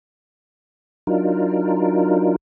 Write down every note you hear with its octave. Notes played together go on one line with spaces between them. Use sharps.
F#3 D4 D#4 F4 A#4